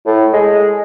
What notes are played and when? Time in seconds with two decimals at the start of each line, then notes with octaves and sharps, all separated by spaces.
0.06 A2
0.33 G#3